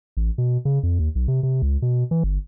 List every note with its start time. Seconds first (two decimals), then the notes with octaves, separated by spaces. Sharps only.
0.17 A1
0.38 B2
0.65 C#3
0.83 F2
0.99 D#2
1.15 B1
1.28 C3
1.43 C3
1.62 C#2
1.82 B2
2.11 E3
2.23 G1